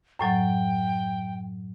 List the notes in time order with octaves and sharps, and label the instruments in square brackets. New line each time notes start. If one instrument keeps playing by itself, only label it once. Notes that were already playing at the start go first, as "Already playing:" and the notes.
[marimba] F#2 A2 F#3 [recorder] G5